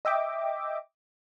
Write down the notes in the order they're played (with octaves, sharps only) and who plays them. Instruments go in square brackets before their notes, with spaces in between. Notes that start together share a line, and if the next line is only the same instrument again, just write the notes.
[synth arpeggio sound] D#5 E5 G5 D6